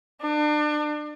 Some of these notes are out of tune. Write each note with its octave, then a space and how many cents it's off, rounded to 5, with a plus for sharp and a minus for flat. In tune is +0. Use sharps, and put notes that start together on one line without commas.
D4 +35